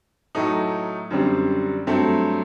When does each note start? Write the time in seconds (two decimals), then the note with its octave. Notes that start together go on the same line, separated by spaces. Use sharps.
0.35 A2 F#3 A3 D#4
1.11 F#2 D3 G3 C4
1.87 G2 F#3 A3 C4